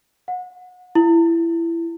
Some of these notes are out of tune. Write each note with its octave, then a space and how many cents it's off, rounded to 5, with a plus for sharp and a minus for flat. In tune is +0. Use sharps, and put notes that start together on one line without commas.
F#5 -30
E4 +20